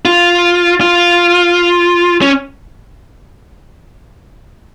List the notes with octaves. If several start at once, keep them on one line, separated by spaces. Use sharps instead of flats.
F4
F4
C#4